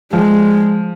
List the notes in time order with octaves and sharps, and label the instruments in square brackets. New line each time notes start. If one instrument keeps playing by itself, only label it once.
[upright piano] F3 [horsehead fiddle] G#3